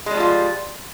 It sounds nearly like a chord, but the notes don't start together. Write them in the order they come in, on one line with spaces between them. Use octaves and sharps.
G#3 G3 F3 F4